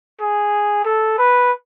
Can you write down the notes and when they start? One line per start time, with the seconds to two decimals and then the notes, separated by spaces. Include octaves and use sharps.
0.21 G#4
0.85 A4
1.18 B4